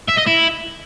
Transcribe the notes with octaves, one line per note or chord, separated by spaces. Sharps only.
E5
D#5
E4